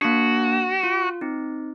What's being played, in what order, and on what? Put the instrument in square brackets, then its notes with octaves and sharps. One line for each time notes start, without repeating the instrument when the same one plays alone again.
[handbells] A#3 D4 [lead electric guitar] F#4
[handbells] F4
C4 D#4